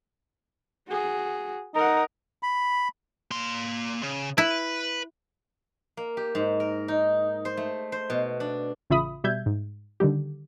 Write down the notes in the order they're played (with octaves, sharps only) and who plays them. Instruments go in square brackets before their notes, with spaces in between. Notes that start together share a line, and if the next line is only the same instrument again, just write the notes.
[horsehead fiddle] F#4 G#4
[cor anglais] D#4 [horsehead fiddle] A#4 F#5
[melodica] B5
[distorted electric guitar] A#3 C6
C#3
[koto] E4 [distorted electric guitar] B4
[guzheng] A#3
G4
G#2
A#4
D#4
C5
A3
C5
B2
D4
[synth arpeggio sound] A1 C#3 F4 E5 B5 D#6
B2 G3 E5 G6 G#6
G#2
D3 D#3 G3 G4